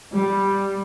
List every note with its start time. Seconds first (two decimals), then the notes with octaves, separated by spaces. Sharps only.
0.16 G3